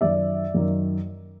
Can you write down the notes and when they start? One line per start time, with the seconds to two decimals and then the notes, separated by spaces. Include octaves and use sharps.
0.01 F#2 D#3 D5 E5
0.54 F#2 D#3